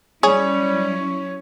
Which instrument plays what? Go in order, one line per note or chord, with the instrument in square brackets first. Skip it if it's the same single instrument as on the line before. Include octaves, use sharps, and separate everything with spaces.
[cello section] F#3 C#4 E4 [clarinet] G3 [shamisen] G#4 [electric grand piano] C#5